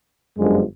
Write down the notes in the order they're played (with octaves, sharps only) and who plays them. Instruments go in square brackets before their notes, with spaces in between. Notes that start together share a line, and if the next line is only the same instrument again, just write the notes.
[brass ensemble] G1 F#2 D3 F3 G#3